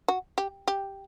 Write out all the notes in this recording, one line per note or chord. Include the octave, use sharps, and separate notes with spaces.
F#4
G4
G4